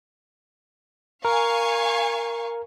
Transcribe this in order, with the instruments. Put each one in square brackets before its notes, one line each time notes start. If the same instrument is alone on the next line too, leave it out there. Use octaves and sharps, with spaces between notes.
[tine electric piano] A#4 [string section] F5 G#5 C#6